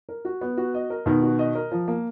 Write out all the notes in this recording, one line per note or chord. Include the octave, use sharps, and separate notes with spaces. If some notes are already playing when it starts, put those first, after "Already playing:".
A#4
F#4
B3
F#4
D#5
A#4
B2 D#3 B3
F#4
D#5
A#4
F3
A#3